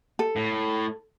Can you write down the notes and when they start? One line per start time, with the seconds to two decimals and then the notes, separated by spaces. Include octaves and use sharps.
0.19 A4
0.36 A2